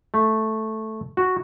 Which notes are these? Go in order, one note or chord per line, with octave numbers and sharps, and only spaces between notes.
A3
F#4